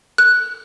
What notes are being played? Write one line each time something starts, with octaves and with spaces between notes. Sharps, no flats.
F#6